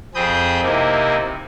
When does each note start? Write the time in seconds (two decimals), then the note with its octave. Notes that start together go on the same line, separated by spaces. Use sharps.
0.15 F2 C4 G#4 B5 D#6 G6
0.62 C3 A#3 D#4 E4